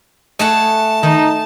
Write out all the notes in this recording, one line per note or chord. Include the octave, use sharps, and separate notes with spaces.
A3 G#4 D#5 F#5 A5
D#3 D#4